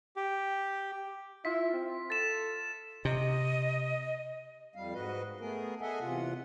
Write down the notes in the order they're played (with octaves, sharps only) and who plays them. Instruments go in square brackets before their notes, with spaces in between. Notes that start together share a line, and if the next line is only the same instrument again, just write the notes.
[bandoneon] G4
[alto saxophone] E4 [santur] F4 [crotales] B6
[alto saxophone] C4
[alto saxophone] A4 [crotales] A6 E7
[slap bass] C3 [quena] D#5
[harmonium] F2 G3 F5
G#2 F#4 B4 D#5
A3 B3 G#4 A#4
G#4 A4 D#5 E5 F#5 G#5
E2 C3 F4 F#5